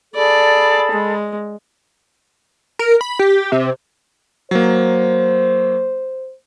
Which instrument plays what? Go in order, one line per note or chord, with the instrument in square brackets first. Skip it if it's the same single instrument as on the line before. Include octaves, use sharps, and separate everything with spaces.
[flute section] G#4 A4 B5 [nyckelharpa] D5
[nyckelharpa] G#3
[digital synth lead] A#4
B5
G4
C3
[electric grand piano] F#3 A#3 [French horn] C5